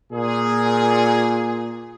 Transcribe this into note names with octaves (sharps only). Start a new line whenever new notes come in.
A#2 G#4